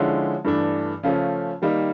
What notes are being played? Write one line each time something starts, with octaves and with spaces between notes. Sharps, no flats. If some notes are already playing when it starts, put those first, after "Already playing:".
Already playing: D3 F3 G#3 C#4 E4
G2 E3 A3 D4
C#3 F3 A3 C#4
D#3 G3 A#3 D#4